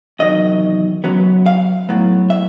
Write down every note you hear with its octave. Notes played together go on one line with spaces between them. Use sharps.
E2 C3 D#3 F#3 D#5
F#2 C#3 F#3 B3
F5
A2 F#3 B3
E5